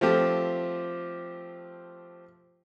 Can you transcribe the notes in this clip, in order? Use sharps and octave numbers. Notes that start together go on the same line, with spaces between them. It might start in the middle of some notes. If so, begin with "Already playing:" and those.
F3 A3 C4 F4 G4